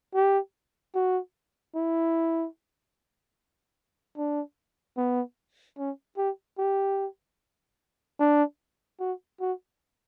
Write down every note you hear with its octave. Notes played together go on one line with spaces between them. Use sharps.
G4
F#4
E4
D4
B3
C#4
G4
G4
D4
F#4
F#4